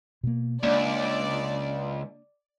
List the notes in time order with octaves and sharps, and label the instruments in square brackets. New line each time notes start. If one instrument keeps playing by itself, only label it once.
[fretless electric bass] B2 A#3
[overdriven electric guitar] C#2 [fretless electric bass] A#3 D4 [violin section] D5